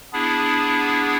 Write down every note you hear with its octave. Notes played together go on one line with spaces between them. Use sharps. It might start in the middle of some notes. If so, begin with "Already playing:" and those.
B3 D4 E4 G#4